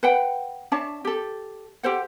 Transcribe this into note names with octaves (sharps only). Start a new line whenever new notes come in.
B4 F#5 G5
D4 C#5 E5 A5
G4 A4
G4 A4 C5 F#5